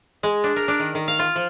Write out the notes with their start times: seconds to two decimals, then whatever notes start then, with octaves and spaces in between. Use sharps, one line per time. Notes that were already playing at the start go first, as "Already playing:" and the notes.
0.23 G#3
0.44 D4
0.56 A#4
0.68 D4
0.80 D#3
0.95 D#3
1.08 F5
1.19 F4
1.36 F3